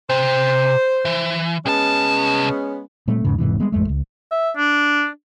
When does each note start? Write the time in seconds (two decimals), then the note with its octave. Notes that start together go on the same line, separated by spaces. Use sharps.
0.10 C3 C5
1.05 E3
1.66 C2 G#3 B3 C#4 A5
3.08 A#2 G3 A3 C4
3.25 E2 G#2 C#3
3.38 E1 G#2 C3 E3
3.60 G3 G#3 B3
3.72 A1 F2 G#3 A3
3.89 C#2
4.31 E5
4.57 D4